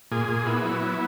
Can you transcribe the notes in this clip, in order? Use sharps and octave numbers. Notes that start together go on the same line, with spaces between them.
A#2 G#4
A#2
B3 E4
F#3
B3